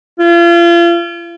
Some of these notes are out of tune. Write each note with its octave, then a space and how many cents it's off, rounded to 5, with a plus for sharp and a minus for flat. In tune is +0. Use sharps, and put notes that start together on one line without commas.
F4 -35